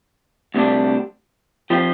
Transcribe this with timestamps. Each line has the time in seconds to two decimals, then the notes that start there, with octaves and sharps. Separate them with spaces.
0.54 D2 C3 G3 D4
1.70 F3 C4 G4 C5